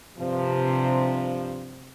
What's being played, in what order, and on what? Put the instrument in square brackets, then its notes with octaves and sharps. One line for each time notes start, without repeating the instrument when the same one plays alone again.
[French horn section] G2 F3 [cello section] C3